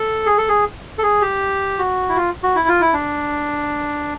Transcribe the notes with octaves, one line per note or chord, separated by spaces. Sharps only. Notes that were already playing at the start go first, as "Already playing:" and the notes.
Already playing: A4
G#4
A4
G#4
A4
G#4
G4
F#4
E4
F4
F#4
E4
F4
E4
D4